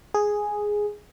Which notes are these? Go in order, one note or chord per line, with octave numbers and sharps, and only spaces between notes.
G#4